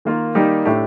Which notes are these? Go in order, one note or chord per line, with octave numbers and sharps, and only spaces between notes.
D#3 A#3 F4
D#3 G3 A#3 D#4 G4
A2 A3 D4 G4